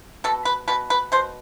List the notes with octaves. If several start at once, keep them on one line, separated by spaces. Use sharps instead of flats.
B2 A4
B4
B2 B4
B4
B2 C5